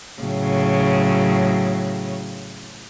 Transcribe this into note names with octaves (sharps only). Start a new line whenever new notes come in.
A2 C#3 F#3